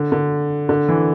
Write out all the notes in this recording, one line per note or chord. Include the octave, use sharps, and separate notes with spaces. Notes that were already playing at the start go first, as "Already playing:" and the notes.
Already playing: D3
D3
D3
E3